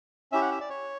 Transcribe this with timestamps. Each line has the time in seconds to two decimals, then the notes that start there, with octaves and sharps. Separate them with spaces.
0.32 C#4 E4 G4 E5
0.41 F#5
0.51 E5
0.61 D5
0.70 C#5